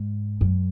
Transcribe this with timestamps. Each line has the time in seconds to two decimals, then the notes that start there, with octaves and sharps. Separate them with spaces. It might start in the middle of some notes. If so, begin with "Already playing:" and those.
Already playing: G#2
0.41 F#2